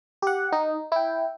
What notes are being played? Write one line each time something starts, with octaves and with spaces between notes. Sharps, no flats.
G4 F#5
D#4
E4 G5